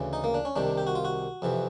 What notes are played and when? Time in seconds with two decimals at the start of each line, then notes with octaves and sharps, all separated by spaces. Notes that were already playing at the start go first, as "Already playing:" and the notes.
Already playing: D2 C#3 E3
0.13 D#4
0.24 A#3
0.34 D4
0.45 C#4
0.56 C2 C3 D#3 D4
0.78 G4
0.87 F#4
0.95 F4
1.05 F#4
1.42 F2 C3 E3